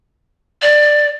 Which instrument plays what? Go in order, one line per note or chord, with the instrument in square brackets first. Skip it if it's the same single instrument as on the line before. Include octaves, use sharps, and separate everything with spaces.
[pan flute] D5